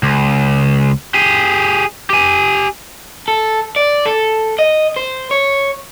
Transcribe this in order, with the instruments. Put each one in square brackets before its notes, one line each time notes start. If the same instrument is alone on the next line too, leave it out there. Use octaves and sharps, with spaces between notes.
[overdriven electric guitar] C#2
G4 G#4
G4 G#5
A4
D5
A4
D#5
C5
C#5